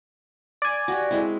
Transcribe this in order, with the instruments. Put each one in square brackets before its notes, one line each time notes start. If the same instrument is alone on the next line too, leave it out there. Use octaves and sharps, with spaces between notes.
[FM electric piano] D5 G#5
[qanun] F#4 G4
G#3 C4 E4